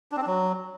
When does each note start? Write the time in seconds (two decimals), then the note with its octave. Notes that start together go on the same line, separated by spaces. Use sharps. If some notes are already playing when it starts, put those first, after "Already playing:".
0.12 D4
0.17 C4
0.22 D4
0.27 F#3